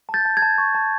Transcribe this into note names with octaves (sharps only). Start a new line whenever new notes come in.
A5
G6 A6
A5
G#6
A5
C#6
A5